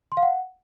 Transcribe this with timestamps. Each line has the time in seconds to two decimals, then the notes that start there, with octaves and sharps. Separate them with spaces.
0.12 C6
0.17 F5
0.23 F#5